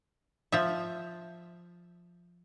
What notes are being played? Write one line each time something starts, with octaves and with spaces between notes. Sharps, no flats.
F3 E5